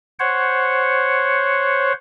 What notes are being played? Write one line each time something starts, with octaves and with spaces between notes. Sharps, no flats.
C5 C#5 F#5